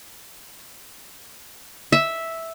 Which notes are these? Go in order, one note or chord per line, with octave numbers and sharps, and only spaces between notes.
E5